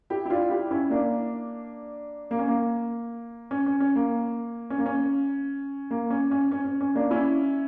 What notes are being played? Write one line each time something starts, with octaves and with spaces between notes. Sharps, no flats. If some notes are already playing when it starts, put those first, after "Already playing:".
E4 G4
E4
D4 F4
E4 G4
C#4 E4
A#3 D4
A#3
C#4
A#3
C#4
C#4
C#4
A#3
C#4
A#3
C#4
A#3
C#4
C#4
C#4
C#4
C#4
A#3 D4
C#4 E4